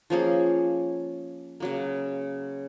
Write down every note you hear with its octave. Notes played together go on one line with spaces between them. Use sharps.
F3 A#3 C#4 G#4
C#3 F#3 A#3